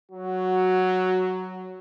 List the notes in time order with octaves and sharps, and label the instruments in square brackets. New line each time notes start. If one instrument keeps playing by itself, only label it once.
[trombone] F#3 [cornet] F#4